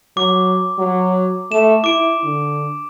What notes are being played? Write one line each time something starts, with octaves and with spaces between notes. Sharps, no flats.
F#3 D6
F#3
A3 E7
E4 D6 D7
D3